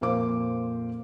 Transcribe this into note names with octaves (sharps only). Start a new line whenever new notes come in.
F2 A#2 A#4 C5 F5 D6